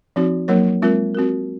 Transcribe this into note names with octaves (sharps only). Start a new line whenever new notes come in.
F3 C4 D#4 F#4
F#3 A#3 D#4 A#4 C#5
G#3 C4 F4 A#4
C4 F#4 A#4